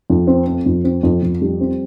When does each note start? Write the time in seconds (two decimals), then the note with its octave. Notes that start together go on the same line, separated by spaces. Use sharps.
0.10 F2
0.27 C4
0.47 C4
0.66 F2
0.84 C4
1.03 F2
1.23 F2
1.42 G3
1.61 C4